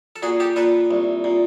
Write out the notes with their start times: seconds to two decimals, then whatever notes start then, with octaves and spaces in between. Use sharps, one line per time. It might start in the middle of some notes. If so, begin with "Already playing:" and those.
0.16 A4
0.23 A#2 F#4 G#4
0.40 G4 A4
0.56 A#2 A4 B4
0.91 C2
1.24 A#2